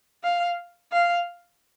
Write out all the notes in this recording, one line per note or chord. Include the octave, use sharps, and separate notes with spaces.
F5
F5